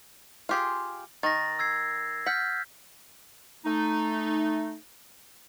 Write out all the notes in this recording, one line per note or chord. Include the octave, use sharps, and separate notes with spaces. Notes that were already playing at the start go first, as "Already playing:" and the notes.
F4 G4 G#4
D#3 A6 A#6
E6 G#6 C7
F#5 F6 G6 B6
A3 D#4